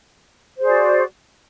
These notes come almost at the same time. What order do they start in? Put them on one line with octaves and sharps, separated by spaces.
C5 G#4 D5 F#4